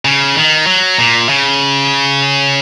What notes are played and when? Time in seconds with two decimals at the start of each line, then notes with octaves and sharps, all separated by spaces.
0.05 C#3
0.36 D#3
0.66 F#3
0.98 A#2
1.29 C#3